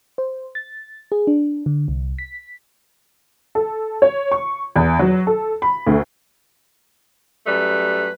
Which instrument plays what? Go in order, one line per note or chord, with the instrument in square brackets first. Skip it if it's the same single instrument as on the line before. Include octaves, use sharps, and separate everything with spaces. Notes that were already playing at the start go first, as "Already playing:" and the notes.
[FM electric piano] C5
A6
G#4
D4
D3
C2
B6
[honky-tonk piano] A4
C#5
C#6
E2
F#3
A4
B5
D2
[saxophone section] F#2 G3 A3 B4